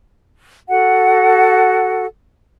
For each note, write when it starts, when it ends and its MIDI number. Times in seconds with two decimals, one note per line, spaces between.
0.69 2.05 66
0.69 2.05 69
0.69 2.05 78